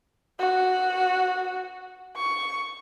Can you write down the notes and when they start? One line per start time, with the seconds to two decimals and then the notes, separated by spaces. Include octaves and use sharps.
0.39 F#4
2.17 C#6